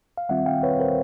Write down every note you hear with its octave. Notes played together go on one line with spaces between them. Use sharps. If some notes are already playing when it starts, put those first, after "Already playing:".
F5
D#3 G3 C4 F4 E5 F#5
F5 G5
B4 C#5
A#4 C5